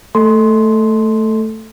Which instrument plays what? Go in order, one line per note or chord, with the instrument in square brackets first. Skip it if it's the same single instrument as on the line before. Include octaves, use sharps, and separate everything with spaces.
[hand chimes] A3 A4 C6